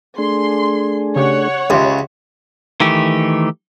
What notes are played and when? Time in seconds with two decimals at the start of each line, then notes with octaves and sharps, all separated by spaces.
0.18 A3 D4 G#4 C6
1.16 C#3 G4 C#5 F#5
1.70 C#2 G4 E5
2.80 D#3 E3 A3 G4